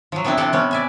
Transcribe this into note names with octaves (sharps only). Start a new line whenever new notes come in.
F3 F#3
F3 B3 C4 D4 E4
C3 F3 C4 A4 D5 F#5
C3 B3 C#4
D5 E5 G#5